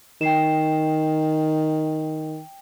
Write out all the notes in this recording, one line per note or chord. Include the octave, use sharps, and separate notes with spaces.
D#3 G5 C7 E7